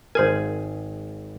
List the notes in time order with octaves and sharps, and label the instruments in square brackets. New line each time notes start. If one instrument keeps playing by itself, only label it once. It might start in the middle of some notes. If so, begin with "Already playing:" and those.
[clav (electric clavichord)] G#1 G#4 G#5 [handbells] A#4 C5